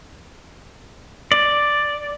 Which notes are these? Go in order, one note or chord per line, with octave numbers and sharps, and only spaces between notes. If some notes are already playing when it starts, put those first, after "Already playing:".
D5